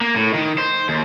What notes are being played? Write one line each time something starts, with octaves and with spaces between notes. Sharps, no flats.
A#3
A2
D#3
C5
D#2